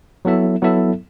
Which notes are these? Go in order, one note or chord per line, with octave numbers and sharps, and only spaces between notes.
F#3 B3 E4 A4 E5
F#3 B3 E4 A4 E5